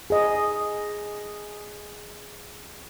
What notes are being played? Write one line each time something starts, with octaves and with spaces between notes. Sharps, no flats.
G#4 D#5